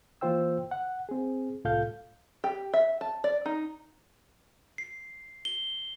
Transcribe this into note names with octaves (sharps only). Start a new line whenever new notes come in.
E3 A#3 F4 C5 G5 E6
F#5
C4 G#4
C2 A2 F4 A4 F5 G6
G4
E5
A5
D5
D#4
C7
G7